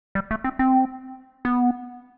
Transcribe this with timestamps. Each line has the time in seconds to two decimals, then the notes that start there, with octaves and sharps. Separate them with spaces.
0.15 G3
0.31 A3
0.44 C4
0.59 C4
1.45 B3